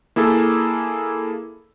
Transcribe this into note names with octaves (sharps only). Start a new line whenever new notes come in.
A#3 E4 G#4 A4